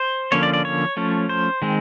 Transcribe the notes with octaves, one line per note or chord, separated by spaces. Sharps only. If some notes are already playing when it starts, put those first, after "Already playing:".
Already playing: C5
D3 F3 A#3 C#4 C#5
D5
D5
C#5
F3 A3 C#4
C5
D#3 G#3 C4